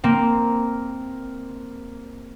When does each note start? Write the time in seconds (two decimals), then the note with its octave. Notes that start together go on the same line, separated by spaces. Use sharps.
0.04 A#3 C4